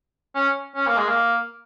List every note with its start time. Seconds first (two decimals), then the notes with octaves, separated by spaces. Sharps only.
0.35 C#4
0.76 C#4
0.87 A#3
0.97 G#3
1.08 A#3